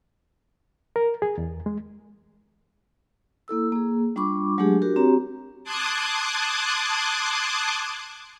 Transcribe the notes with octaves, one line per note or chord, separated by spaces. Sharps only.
A#4
G#4
E2
G#3
A#3 E4 A4 E6
A#3 G#4
G3 D4 F4 B5 C#6 D6
F#3 G#3 A3 D4 G4 G#4
D4 F#4 G4 A#4
C4 F#4 G4 C#5 A#5
A5 C6 D6 D#6 F#6 G#6